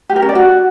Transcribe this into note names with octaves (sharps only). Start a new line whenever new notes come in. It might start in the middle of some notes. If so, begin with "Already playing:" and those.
G4
A#4
C#4
D5
F#4